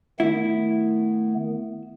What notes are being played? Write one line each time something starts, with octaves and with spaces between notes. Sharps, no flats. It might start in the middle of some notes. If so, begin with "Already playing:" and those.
D#3 A3 B3 E4